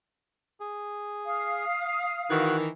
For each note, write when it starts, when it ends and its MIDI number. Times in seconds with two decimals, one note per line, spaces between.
0.60 1.65 68
1.24 2.52 77
1.24 2.52 87
2.30 2.68 51
2.30 2.68 52
2.30 2.57 66
2.30 2.57 90